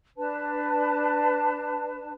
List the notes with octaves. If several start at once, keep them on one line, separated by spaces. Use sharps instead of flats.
D4 B4 A5